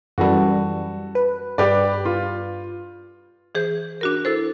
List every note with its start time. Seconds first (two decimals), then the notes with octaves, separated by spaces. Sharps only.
0.18 F#2 E3 G3 F#4 A4
1.15 B4
1.58 G2 G4 B4 D5
2.05 F4
3.55 E3 G#4 C5 G6
4.01 D4 F#4 A#4
4.25 E4 A4 C5